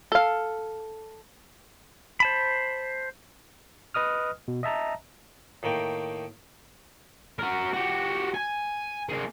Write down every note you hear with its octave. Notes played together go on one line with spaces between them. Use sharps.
A4 F5
C5 A5 B5
B4 D#5 D#6 F6
B2
D#5 E5 A5 A#5
A2 D#3 A#3 G5
F#4 A#4
F#4 G4
G#5
A#3 G#4